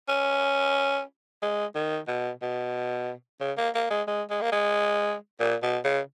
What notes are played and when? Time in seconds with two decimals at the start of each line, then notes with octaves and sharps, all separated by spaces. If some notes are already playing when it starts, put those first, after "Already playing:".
0.08 C#4
1.42 G#3
1.75 D#3
2.07 B2
2.42 B2
3.40 C#3
3.57 A#3
3.75 A#3
3.90 G#3
4.07 G#3
4.30 G#3
4.41 A#3
4.52 G#3
5.40 A#2
5.62 B2
5.84 C#3